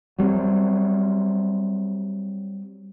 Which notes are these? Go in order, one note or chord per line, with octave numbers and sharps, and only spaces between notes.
F#3 G3 A#3 C4